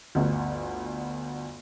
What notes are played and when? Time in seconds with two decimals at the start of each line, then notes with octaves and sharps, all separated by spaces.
0.15 G1 D2